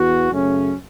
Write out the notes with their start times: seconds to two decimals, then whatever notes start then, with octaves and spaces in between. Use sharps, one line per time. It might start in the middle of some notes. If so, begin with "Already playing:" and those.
Already playing: E2 E3 B3 F#4
0.32 F#2 C#3 A3 C#4